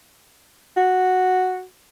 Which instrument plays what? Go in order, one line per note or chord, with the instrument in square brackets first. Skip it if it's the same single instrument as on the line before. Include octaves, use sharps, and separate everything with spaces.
[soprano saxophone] F#4